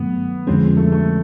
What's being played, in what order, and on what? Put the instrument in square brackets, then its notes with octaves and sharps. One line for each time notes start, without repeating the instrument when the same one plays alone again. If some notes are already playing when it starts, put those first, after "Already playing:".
Already playing: [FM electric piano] G2 D#3 F#3 A3 [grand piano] B3
[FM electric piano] F2 D3 F3 G#3 C#4 [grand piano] C4
[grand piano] A3
A3